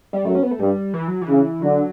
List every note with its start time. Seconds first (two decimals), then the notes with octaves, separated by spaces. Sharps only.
0.13 G3
0.25 F#2 A3
0.35 C#4
0.43 B3
0.51 A3
0.59 G2 G3
0.94 E3
1.08 F#3
1.21 E3
1.28 C#3
1.62 D3 F#3